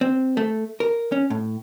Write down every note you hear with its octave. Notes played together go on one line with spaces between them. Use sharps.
C4
A3
A#4
C#4
A2